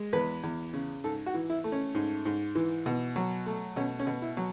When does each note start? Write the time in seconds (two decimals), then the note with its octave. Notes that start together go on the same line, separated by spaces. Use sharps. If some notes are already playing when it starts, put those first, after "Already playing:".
Already playing: G#3
0.13 E2 B4
0.43 E2
0.73 C#3
1.04 G#2 A4
1.26 F#4
1.34 E3
1.50 E4
1.64 A3
1.72 C#4
1.95 G#2
2.26 G#2
2.55 E3
2.86 B2
3.16 F#3
3.46 A3
3.76 B2 C#4
3.99 C#4
4.07 B2
4.22 E4
4.37 F#3